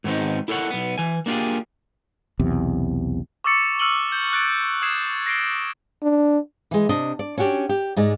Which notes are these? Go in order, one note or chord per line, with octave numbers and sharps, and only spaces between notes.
G#2 D#3 B3 C4 D#4
E4 A4 A#4 C#5 F#5
B1 B3
E3 G#5
A#3 D4 F4 G4 G#4
B1 E2 C3
C#6 D6 E6 A6 C#7
E6 F6 C#7 D#7 F#7 G7
G6
C#6 F#6 A6 D7
D#6 G#6 C7 E7
A#6 C7 D7 G7
D4
E3 G#3
C3 D4 D#5
D5
C#4 D4 F#4 G4 D5
G4
G#2 G#3 D5